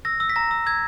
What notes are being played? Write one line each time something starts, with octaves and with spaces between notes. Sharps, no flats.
E6 A#6
E6
B6
A#5 A#6
E6
E6 G#6